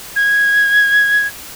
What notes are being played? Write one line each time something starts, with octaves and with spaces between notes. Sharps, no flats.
G#6